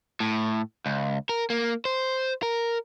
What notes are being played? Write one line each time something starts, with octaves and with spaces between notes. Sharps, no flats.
A2
C#2
A#4
A#3
C5
A#4